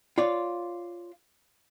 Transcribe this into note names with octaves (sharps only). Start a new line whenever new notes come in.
F4 C#5 D5